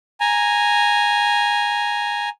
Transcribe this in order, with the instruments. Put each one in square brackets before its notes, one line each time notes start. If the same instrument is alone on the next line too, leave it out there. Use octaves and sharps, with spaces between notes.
[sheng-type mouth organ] G#5 A#5